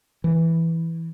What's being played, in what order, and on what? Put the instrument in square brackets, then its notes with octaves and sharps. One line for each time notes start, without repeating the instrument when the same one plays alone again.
[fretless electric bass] E3